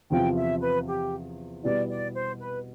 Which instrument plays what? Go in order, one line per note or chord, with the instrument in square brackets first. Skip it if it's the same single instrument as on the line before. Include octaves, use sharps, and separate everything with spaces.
[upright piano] E2 C3 F3 B3 F4 [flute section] G5
[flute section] E5
B4
G4
[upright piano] B2 G3 B3 E4 [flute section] D5
[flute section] D5
C5
B4